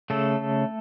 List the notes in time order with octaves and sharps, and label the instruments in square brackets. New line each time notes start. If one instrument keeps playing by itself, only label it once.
[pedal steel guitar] C#3 A3 A4